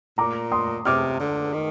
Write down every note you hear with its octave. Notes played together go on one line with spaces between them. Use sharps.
A#2 A#5 D6
C6 D#6
C3 D6 F6
D3
D#3